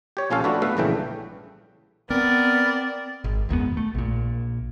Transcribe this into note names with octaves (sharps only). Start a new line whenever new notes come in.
G4 C#5
A#1 F3 C#4 F4 A4 F5
F3 A3 D4 F#4 A4 B4
A3 B3 B4 E5 F5
A#1 G2 C#3 E3 A3 G5
B3 C4 A#4 D5
G#1
F#1 D#2 G#2 B3
A3
A#1 A#2